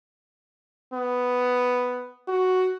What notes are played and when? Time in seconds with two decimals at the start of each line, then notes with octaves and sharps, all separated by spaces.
0.93 B3
2.28 F#4